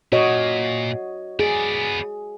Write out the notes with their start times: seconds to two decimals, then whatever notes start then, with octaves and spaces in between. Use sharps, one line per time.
0.12 A#2 F#4 C#5 D#5
1.39 B3 G#4 D5